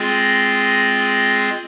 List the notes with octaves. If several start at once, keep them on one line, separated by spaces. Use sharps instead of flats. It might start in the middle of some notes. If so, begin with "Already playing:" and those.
Already playing: G#3 C4 F4 G#4 D#5